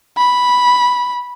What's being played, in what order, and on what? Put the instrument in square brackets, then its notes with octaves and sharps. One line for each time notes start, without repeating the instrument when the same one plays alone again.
[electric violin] B5